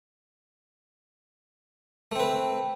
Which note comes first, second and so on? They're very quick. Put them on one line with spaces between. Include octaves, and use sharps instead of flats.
A3 C4 B4